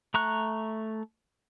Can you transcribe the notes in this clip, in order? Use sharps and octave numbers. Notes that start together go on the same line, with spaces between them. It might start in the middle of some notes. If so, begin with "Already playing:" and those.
A3 A#5 C#6 F#6